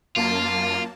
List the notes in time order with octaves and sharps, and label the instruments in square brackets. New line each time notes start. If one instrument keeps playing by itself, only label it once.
[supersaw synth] F#2 A#3 A5 [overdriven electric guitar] F4